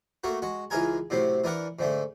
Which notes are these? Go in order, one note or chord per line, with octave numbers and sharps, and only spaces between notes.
A3 A#3 F#4
G#3 F#4
C#2 E3 G#3 G#4 A#4 G#5
A2 C3 F#3 C4
E3 D4 A#4 F#5
G#2 D3 A3